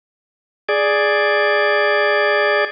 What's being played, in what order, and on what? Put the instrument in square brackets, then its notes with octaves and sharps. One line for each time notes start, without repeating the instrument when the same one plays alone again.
[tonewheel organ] G#4 D5